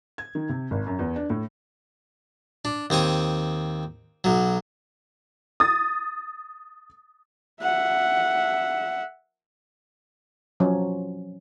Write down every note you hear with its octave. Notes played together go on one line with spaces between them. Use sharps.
G#6
D#3
C3
G#1
F#2
E2
D4
A2
D4
D#2 C4 C#5 D#6
B1 F#3
D#6 A6
E5 F#5
F3 F#3 C#4